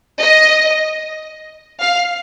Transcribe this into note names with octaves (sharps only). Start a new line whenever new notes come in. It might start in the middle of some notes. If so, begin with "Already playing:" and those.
D#5
F5